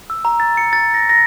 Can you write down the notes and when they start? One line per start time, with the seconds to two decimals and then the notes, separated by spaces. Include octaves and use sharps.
0.10 E6
0.25 A#5
0.40 A6
0.57 C#7
0.73 A6
0.94 A#6
1.09 A#6